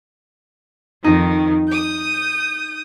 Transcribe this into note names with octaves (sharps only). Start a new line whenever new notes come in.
F2 D#3 D#4
D#6 G6